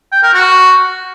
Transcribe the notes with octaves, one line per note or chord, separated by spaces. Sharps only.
G5
A#4
F#4